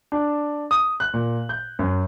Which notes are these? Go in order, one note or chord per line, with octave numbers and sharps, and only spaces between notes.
D4
D#6
F#6
A#2
G6
F#2